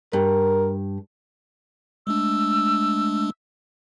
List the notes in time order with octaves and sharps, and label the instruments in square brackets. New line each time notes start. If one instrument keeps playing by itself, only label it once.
[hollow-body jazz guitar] G2 [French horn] A#4
[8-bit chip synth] G#3 A3 D4 [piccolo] E6